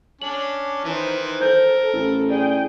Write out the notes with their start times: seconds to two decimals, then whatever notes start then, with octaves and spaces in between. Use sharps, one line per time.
0.22 C#4 D4 F#7
0.85 D#3 E3 D#4 B4 C5
1.41 A4 A#4 C5 G6
1.93 A1
2.30 G#4 D5 G5